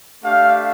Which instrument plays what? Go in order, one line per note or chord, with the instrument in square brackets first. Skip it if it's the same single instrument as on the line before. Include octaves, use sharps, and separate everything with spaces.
[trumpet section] A3 D4 G4 F5